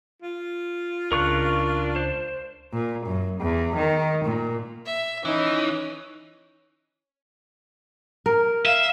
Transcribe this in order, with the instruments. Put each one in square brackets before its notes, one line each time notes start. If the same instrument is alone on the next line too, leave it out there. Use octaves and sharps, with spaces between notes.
[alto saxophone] F4
[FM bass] C#2 [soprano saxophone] D4 [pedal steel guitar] A#4 C#6 F#6
[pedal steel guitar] C5
[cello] A#2
F#2
E2
D#3
A#2
[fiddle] E5
[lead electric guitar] E3 [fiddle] C#4 [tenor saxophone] D#4
[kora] A#4
[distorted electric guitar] E5 [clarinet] F5